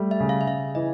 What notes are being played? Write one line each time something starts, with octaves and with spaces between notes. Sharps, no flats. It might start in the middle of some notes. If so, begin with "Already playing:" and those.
Already playing: G3 A3
E5
C#3
F5
E5
C#3 F5
E3 D#5